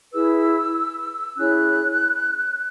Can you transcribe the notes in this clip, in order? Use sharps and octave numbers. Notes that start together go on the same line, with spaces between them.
E4 G#4 B4 E6
C#4 E4 G#4 C#5 F#6